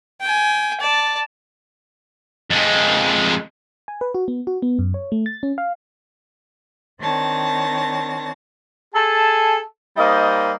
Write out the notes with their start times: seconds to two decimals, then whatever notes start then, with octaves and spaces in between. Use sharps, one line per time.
0.21 G5 G#5
0.80 D5 A5
2.50 F2 G#3
3.88 G#5
4.01 B4
4.14 F#4
4.28 B3
4.47 F#4
4.62 B3
4.79 F#2
4.94 C#5
5.12 A3
5.26 A6
5.43 C#4
5.58 F5
7.00 D#3 C4 D4 C#5 A5 A#6
8.94 G#4 A4 G#5 A5
9.97 G3 A#3 D#4 C5 D#5